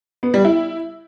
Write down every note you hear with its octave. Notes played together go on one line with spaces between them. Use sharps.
B3
G3
E4